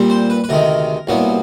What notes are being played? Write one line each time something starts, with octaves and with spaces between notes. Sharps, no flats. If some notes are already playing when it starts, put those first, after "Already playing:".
Already playing: A#2 G3 C4
C5
B4
B4
D2 C3 D#3 G#3 A#4
C2 A#2 F#3 B3